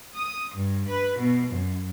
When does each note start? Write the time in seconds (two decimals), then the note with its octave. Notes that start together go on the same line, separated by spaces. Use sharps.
0.14 D#6
0.56 G2
0.89 B4
1.19 B2
1.51 F#2